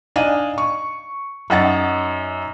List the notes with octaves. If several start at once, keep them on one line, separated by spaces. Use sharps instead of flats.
D4 D#4 D#5 F5 G#5 D#7
C#6
F#2 D#4 F#5 A6